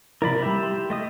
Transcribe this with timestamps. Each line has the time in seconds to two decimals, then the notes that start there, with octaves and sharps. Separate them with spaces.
0.22 C3 F3 E4 A#4 D5 B5
0.42 G3 E4 G4 E5
0.63 C6
0.90 A3 D#5 D#6